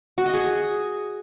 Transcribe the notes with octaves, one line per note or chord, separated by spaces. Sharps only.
F#4
D#5
G#4